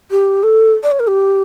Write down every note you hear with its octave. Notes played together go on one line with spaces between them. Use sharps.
G4
A4
D5
C#5
A#4
G4